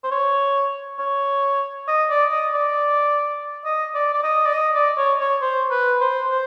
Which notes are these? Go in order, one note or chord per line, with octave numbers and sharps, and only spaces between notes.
C5
C#5
C#5
D#5
D5
D#5
D5
D#5
D5
D5
D#5
D5
D#5
D5
C#5
C#5
C5
B4
C5
C5